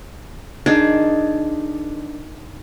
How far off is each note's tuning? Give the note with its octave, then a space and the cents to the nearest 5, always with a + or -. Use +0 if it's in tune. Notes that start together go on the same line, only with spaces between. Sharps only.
D#3 +0 D4 +0 G#4 +15